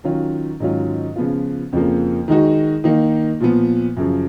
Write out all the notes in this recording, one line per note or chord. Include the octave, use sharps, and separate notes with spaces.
D#3 F#3 C#4 F4
G#2 D#3 F#3 C#4 F4
C#3 F3 B3 F4
F2 C#3 F3 A#3
D#3 G#3 D#4 F#4
D#3 A#3 D#4
A#2 F3 B3
F#2 C#3 F3